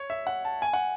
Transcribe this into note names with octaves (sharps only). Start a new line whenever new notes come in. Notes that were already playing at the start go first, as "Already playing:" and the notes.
Already playing: C#5
E5
F#5
A5
G#5
F#5